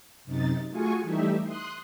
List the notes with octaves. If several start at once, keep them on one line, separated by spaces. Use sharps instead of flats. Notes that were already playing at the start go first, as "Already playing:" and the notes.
F#2 C3 D#4 A6
A3 F4 F#4 G#4 G#5 C#6
E3 G3 A3 D#4 G4 E5
C6 D#6 F#6